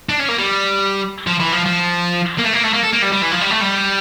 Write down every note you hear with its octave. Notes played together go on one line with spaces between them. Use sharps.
D4
C#4
A#3
G3
F3
E3
F3
F3
A#3
A3
A#3
A3
A#3
A4
A#3
G3
G3
E3
F3
G3
A3
G3